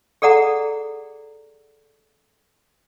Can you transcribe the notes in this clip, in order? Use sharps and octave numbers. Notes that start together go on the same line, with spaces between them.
G#4 A4 D5 F#5 A#5